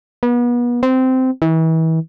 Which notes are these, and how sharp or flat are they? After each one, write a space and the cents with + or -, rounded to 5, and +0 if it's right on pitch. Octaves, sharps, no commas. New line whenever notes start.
B3 -35
C4 -15
E3 -35